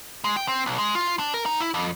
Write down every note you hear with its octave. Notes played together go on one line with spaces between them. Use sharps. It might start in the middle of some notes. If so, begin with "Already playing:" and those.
G#3
G5
C4
B1
G#3
F4
D4
A#4
D#4
E4
F2